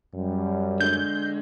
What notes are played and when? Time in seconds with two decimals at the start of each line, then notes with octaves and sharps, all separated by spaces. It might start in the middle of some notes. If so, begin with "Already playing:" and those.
0.15 F#2 G3
0.81 D3 G#3 G6